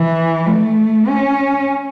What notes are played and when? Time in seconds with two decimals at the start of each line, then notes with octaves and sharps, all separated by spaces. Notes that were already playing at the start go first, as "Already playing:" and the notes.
Already playing: E3
0.47 A3
1.09 C#4